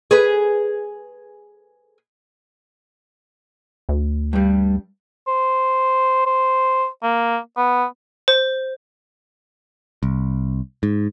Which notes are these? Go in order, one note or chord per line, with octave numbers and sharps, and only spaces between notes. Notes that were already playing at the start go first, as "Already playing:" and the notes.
G#4 B4
D2
G2 G3
C5
C5
A#3
B3
C5
C2
G#2